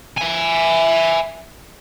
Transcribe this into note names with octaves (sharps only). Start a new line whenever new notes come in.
E5 G#5